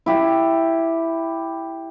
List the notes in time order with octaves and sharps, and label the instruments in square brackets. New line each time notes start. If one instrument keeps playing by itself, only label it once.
[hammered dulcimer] E4 G4